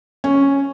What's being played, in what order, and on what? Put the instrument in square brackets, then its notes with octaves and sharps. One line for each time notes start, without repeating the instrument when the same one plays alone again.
[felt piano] C#4